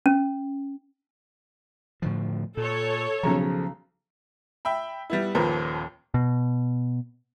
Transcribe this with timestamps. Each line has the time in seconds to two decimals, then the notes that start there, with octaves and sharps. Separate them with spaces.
0.06 C#4
2.02 A2 D3 F3
2.57 A#2 A4 C#5
3.23 B1 C#3 F3 A#5
4.65 E5 G5 B5
5.10 G3 B3 E4
5.35 D#1 D#2 F3 A#4 B4
6.14 B2